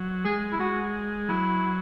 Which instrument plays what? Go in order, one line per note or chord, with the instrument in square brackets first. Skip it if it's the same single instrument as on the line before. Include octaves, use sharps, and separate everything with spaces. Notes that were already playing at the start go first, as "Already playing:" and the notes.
Already playing: [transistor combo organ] F#3
[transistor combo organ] G#3 [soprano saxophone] G#4
[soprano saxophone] E4
[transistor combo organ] G#3 [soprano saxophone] F#4
[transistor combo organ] F#3 [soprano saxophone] E4